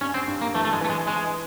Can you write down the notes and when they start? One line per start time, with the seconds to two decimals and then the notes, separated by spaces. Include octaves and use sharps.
0.01 G2 C#4
0.14 C4
0.28 G2
0.41 A#3
0.54 E3 A3
0.65 A3
0.73 G#3
0.81 E3 A3
0.90 G#3
1.07 E3 G#3